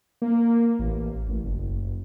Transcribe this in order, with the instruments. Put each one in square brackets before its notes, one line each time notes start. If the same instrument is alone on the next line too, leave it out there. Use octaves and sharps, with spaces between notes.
[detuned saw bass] A#3
A1
A1
F#1